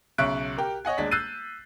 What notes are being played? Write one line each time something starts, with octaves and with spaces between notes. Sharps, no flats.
B1 C#3 E5 C#6 F#6 D7
G4 A#4
C#5 D#5 F#5 G#5
D#1 G#3 D4 B6
E6 F#6 G6 A6 C7 D#7